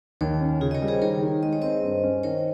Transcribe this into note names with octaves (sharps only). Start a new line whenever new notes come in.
D#2 A#4 C#5
C#4
C#3 F4 G#4
D#5
A#4 C#5
G3
G#4 C5
D#3 A#4 C#5
D#3
G#3 D#5
C#5
C4 C5 D#5
G2
C#4
D#3 A#4 C#5